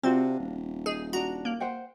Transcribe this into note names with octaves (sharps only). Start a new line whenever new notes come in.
C3 C4 D4 F4 F#4
D#1
D#4 G#4
D4 F#4 A#5
A#3
C5 F#5 G5